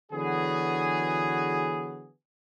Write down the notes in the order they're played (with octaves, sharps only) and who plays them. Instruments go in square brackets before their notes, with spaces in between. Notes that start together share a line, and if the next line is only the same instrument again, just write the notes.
[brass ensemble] D3 E3 F#3 B3 F#4 G#4